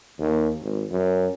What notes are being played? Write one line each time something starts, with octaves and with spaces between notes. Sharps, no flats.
D#2
G#1
F#2